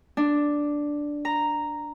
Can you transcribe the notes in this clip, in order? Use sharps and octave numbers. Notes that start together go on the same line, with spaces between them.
D4
A#5